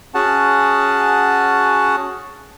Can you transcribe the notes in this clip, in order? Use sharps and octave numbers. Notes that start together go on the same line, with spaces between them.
C#4 F#4 G#4 F#5 A5